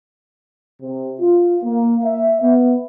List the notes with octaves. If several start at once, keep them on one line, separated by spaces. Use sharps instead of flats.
C3
F4
A#3
E5
B3